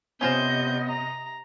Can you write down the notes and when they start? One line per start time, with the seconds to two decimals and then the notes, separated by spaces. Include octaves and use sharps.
0.21 C3 B3 C#4 F4 C5 D#5 G6
0.88 A#5